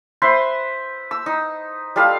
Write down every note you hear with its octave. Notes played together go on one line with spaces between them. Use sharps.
B4 C5 E5 C6
E6
D#4
G3 F4 A4 F5